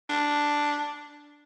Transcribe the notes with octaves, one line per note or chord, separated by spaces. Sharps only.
D4